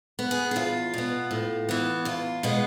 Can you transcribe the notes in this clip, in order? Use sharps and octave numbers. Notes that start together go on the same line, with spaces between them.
B3
G#4
G#4
E2 F4
B2 B3
A2
E3 B3
E2 F4
B2 G#3 B3